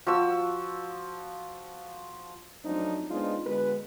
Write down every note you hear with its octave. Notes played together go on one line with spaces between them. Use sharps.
F3 F#4 E6
F3 F#3 A3 C4 D4 D#4
G#3 B3 C4 D4 D#4 F4
D3 G#3 B3 F#4 B4